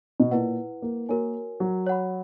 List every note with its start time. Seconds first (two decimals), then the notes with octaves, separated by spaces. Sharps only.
0.20 B2
0.31 A#2 E4 B4 F#5
0.82 A#3
1.09 A#3 F#4 A#4 C#5 G#5
1.60 F#3
1.87 C#5 F#5 B5